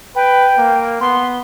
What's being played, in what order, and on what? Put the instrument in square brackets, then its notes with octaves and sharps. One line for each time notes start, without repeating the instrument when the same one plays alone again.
[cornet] B4 [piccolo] G5
[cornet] A#3
[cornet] B3 [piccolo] C6